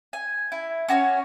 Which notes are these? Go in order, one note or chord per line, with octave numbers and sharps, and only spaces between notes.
G#5
E4
C#4 F#4 A#4 C#5